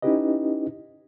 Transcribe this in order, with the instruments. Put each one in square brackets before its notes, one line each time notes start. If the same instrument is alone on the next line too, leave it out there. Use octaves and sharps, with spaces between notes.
[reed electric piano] C#4 D#4 E4 G4 B4 D#5